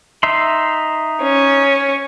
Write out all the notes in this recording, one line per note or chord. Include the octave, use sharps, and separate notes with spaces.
D#4 E5 C6
C#4